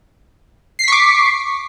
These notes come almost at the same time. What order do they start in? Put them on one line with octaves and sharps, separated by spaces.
C7 B6 C#6 D6